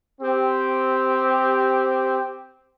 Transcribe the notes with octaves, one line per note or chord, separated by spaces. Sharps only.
C4 G4